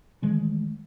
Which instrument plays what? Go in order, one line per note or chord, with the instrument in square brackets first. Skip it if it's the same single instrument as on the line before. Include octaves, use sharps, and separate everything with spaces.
[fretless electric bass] D#3 E3 G#3 A3